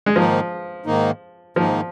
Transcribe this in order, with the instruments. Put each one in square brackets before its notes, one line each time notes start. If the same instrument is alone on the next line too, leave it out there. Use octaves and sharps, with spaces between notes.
[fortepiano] G#3
[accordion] G#2 D#3 A#3 D#4 [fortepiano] F3
[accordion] G#2 D#3 A#3 D#4
[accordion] G#2 D#3 A#3 D#4 [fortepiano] F3